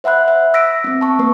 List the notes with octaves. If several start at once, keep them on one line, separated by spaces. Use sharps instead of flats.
C5 E5 F#5 B5 F#6
E5
E6 A#6 B6 D7
B3 C4
A5 C#6
A#3 B4